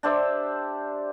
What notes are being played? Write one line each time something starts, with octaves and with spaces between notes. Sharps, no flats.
D4 G4 C5 E5